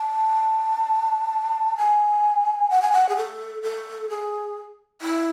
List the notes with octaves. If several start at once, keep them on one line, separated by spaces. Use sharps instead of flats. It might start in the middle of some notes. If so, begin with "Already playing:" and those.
Already playing: A5
G#5
F#5
G#5
F#5
G#4
A4
A4
G#4
E4